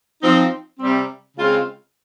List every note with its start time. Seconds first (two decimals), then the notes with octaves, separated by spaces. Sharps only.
0.22 F3 C4 D#4
0.79 C3 G3 C4
1.36 C#3 G#3 C4 F4